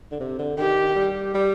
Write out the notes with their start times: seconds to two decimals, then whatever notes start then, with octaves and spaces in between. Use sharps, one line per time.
0.12 D3
0.20 C3
0.39 D3
0.57 D#3 G4
0.95 G3
1.34 G3